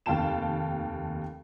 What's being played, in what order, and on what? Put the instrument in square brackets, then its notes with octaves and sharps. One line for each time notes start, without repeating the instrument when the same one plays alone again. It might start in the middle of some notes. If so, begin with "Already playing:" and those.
[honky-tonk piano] F1 D#2 F5 G5 A5 E7